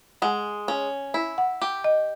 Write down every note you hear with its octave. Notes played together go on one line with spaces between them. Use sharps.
G#3 F#5
C#4
E4
F#5
G4
D#5